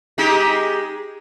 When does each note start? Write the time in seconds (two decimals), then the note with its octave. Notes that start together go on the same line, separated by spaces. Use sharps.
0.18 G#3 D#4 G4